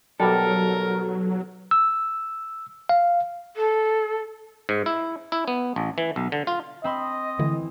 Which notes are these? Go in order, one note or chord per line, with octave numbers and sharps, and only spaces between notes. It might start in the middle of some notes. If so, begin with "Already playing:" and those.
B1 F#3 G3 A4 A#4
E6
F5
A4
G#2
E4
E4
B3
A1
E3
B1
D3
F4
C4 D#5 B5 C6
D3 E3 A3 E4